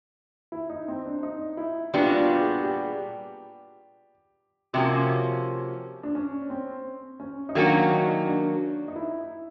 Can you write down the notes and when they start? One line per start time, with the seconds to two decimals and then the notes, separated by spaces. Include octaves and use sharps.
0.52 E4
0.70 D#4
0.88 C4
1.06 D4
1.23 D#4
1.57 E4
1.94 A#2 G3 B3 D4 F4 F#4
2.17 F4
2.40 G#4
2.63 G4
4.73 C3 F3 A#3 C#4 F#4
6.03 D4
6.15 C#4
6.50 C4
7.20 C#4
7.49 D#4
7.55 D#3 F#3 A#3 C#4 D4 F#4
7.91 D#4
8.26 D4
8.88 D#4
8.96 E4